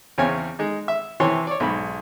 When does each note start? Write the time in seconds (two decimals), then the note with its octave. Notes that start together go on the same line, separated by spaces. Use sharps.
0.18 E2 C#3 C4 C#5 G#5
0.59 G#3 D#4
0.88 E5
1.20 C3 E3 G4 C#5 A5 C6
1.47 C#5 D5
1.60 B1 G#2 B5